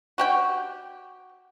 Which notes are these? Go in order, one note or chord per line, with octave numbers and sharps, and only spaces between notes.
F#4 G4 G5